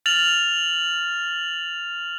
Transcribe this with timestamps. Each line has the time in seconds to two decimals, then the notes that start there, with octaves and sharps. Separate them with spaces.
0.06 F6 A6 F7 F#7